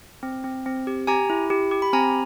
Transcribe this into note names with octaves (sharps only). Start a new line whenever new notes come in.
C4
C4
C4
G4
G4 G#5 A#5
E4
G4
G4
B5
C4 G#5 A#5